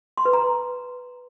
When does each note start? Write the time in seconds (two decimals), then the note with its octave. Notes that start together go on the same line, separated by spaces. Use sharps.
0.17 C6
0.25 B4
0.33 A#5